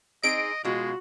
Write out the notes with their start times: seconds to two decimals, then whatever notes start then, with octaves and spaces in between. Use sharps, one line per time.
0.23 C4 D#4 G#4 D#5 D7
0.65 B2 G#3 F4 F#4